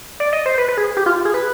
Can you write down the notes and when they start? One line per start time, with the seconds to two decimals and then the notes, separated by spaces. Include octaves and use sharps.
0.20 D5
0.33 D#5
0.46 C5
0.58 B4
0.68 B4
0.77 G#4
0.97 G4
1.06 F4
1.25 G#4
1.34 B4